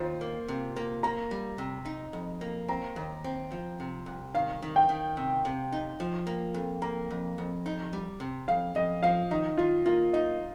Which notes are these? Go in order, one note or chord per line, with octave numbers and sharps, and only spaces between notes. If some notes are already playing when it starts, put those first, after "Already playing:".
Already playing: D#2 F4 C5
A#3
C3
A#3
A#3 A#5
G3
C3
D#4
F2
A#3
C4 A#5
D#2
C4
F3
C3
C2
D#3 F5
D#3
G5
D#3
C3
C3
D#4
F3
A#3
F2
A#3 A#5
F2
F2
D#4
G3
C3
F2 F5
F2 D#5
F3 F5
D#3 D#4
D#3 F4
A#3 F4
D#4 D#5